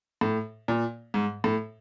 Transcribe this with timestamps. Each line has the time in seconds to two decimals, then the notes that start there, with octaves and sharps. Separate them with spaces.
0.21 A2
0.68 A#2
1.14 G#2
1.44 A2